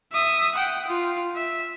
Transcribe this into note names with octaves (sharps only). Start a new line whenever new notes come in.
E5 D#6
F#5 G5
F4
E5